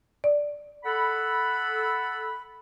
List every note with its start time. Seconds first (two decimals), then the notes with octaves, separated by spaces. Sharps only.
0.24 D5
0.85 A4 F#5 B5